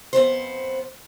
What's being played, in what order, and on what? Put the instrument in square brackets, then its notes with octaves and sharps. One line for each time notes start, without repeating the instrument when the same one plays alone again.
[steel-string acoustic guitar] F2 B2 B3 C5